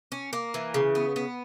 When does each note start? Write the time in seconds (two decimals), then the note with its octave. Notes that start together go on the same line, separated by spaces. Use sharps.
0.12 C#4
0.33 A#3
0.54 E3
0.74 C#3
0.95 B3
1.16 B3